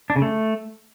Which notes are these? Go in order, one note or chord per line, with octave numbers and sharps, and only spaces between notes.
D4
C#3
A3